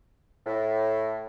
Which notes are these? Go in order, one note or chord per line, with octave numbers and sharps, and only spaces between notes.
A2